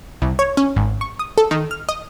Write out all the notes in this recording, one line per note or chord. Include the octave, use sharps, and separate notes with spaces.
C2
C#5
C#4
G#1
C#6
D#6
A4
D#3
F6
D#5